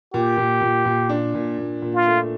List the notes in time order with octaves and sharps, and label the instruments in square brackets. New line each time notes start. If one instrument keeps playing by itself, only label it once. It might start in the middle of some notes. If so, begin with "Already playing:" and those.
[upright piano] A#2 [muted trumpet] G4
[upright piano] A#2
A#2
A#2
D4
A#2
A#2
A#2
[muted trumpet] F4
[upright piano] A3